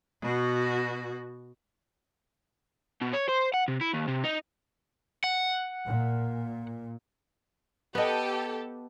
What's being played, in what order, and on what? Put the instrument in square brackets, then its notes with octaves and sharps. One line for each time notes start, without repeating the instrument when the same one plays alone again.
[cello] B2 F#4
[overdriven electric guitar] B2
C#5
C5
F#5
C3
E4
D#2
C3
D#4
F#5
[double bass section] A#2
[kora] B3 D#5 [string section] G4 A4